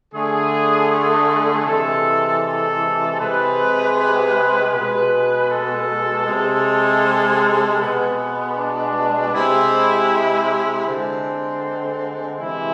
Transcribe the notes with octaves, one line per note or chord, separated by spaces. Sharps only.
D3 A3 G#4
G#4
C3 E3 G#3 A4
A4
C3 G#3 B4
B4
B2 G#3 B4
A4
C3 G#3
B2 G#3 B3
D4
C3 G#3 E4
D3 G#3 C4
C3 E3 G#3 E4